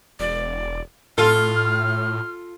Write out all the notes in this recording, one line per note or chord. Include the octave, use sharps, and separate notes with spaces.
E1 D5
A2 F4 A4 F6